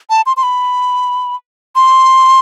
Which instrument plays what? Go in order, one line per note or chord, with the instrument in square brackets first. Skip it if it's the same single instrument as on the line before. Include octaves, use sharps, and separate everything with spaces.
[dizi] A5
C6
C6
B5
C6